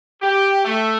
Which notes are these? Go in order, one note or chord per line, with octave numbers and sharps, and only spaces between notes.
G4
A3